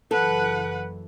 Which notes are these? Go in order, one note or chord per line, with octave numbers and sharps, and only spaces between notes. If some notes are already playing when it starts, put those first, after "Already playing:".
F#1 F#2 E3 A4 B4 F#5